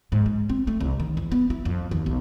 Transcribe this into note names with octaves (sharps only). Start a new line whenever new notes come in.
G#2
G#3
C4
A3
C2
D#3
E2
B3
E4
F2
D#2
B1